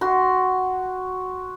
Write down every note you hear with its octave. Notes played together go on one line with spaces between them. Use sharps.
F#4 C6